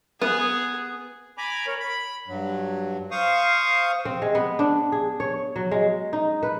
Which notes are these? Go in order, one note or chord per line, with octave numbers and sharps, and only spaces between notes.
B3 G#4
G#5 A#5 B5 D6
A#4 C#5
B5
G2 F#3
C5 F5 C#6 D#6
C4
G#3
B3
D4
G#4
C#5
F#3
G#3
D#4
B4